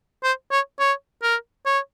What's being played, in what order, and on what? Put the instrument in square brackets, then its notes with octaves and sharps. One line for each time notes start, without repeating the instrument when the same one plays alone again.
[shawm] C5
C#5
C#5
A#4
C#5